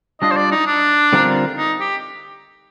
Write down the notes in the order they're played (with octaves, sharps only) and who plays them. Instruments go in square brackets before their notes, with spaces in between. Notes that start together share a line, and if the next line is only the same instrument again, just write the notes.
[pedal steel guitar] G3 D4 F4 [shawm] D#5
[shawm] C5
D5
D#4
D4
[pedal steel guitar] D3 G3 C4 F4 A#4
[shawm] D#4
G4